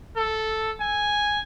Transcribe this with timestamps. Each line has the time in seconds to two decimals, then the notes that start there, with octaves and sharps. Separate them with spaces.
0.17 A4
0.80 G#5